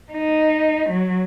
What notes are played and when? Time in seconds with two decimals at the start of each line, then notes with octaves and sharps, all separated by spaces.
0.13 D#4
0.90 F#3